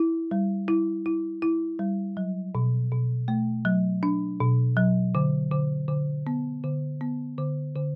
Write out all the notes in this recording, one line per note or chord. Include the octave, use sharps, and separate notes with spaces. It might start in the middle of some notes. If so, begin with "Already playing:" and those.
Already playing: E4
G3
E4
E4
E4
G3
F#3
B2
B2
A3
F#3
D4
B2
F#3
D3
D3
D3
B3
D3
B3
D3
D3